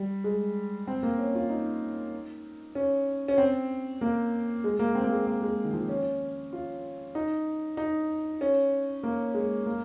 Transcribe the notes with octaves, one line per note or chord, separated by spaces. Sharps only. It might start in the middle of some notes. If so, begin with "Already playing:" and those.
Already playing: G3
G#3
C4
A#3
C#4
F4
D#4
C#4
C#4
C4
A#3
G#3
A#3
C4
A#3
G#3
A#3
G#3
D#3
F3
C#4
F4
D#4
D#4
C#4
A#3
G#3
A#3